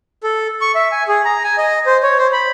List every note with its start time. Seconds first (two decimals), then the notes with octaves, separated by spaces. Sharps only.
0.23 A4
0.61 C#6
0.75 E5
0.92 G#5
1.08 G#4
1.25 A#5
1.44 G#5
1.58 D#5
1.86 C5
2.03 C#5
2.19 C5
2.33 B5